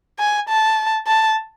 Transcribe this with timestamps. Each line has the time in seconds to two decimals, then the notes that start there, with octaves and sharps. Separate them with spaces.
0.19 G#5
0.49 A5
1.07 A5